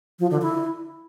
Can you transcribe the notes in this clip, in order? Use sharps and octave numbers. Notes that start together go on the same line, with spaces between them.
F3
D3
E4